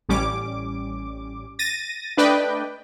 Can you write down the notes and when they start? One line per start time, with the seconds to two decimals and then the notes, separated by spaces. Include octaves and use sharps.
0.09 A1 G3 C#4 D6
1.59 A6 A#6 D#7
2.17 A3 D4 B4 D5 D#5 G5